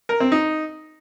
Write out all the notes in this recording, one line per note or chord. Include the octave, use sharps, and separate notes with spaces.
A#4
C4
D#4